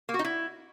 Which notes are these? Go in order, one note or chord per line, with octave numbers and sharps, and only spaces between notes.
A#3
F#4
D#4
E4